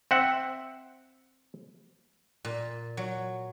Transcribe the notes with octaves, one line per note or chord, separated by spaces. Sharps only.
C4 E5 F#5
A#2
F#3